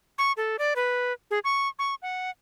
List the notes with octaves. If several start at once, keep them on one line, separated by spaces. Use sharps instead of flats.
C#6
A4
D5
B4
G#4
C#6
C#6
F#5